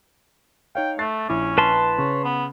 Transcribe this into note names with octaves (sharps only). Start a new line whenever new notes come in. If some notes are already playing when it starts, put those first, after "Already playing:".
D#4 C#5 F5 G5
A3 F#6 A6 C7
A#1 C#4 E4 D6
B4 A5 C6
C#3 C#5
B3